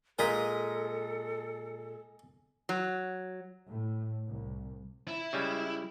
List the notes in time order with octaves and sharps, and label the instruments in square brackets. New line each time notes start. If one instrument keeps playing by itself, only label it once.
[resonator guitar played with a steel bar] A#2 G#3 [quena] A4 [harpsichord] A#4 D#5 [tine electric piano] G#5 A6 B6
[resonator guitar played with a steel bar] F#3
[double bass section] A2
C2
[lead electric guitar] E4
[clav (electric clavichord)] C#3 G3 G#3